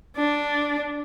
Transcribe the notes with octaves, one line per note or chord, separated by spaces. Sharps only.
D4